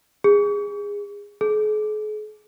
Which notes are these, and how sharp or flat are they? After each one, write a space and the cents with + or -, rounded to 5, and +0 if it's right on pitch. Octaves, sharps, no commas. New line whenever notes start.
G#4 -25
G#4 +45